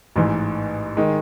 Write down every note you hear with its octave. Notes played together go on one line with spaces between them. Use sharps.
A1 G#2 E3
D#3 G#3